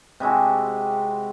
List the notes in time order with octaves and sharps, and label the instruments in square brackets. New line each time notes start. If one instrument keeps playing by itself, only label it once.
[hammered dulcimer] C3 G#3 E4 F#4